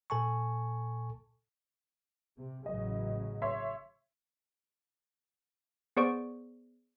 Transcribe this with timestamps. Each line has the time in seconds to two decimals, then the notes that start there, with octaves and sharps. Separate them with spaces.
0.10 A#2 A4 G#5 A5 C#6
2.36 C3
2.66 A1 C#3 F#3 D#5
3.42 C#5 E5 C6
5.97 B3 G#4 C5 D5 C#6 D7